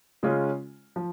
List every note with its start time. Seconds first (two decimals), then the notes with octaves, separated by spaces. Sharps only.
0.23 C#3 G#3 C#4 F4
0.96 F3